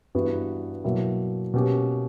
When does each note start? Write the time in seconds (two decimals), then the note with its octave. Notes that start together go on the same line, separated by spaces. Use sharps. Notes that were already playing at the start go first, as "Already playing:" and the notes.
0.15 G2 E3 G3 B3 F#4
0.84 B2 F#3 A#3 E4
1.54 B2 A#3 C#4 G4